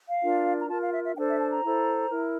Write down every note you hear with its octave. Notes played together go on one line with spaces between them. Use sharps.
F5
D4 F4 A#4
A#5
F4 A#4 A5
F5
E5
E5
D4 A4 C5 G5
E5
A5
A#5
E4 A4 C5
E4 A#4